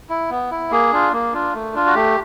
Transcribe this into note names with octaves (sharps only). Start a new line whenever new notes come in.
E4
B3
E4
A#3 G#4
D4 F4
A#3
D4 F4
A3
D4 F4
F#4
A3 G4